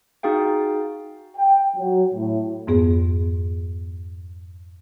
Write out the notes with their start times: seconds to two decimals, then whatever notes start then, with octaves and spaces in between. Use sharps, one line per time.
0.23 D#4 F#4 G#4 F5 G5
1.38 G5
1.77 F#3
2.14 A2
2.67 F2 G#2 B3 G#4